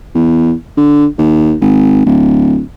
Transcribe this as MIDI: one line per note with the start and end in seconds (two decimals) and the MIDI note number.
0.15 0.54 40
0.77 1.06 50
1.18 1.55 39
1.61 2.05 32
2.06 2.60 26